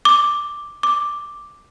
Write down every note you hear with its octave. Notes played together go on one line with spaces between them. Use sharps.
D6
D6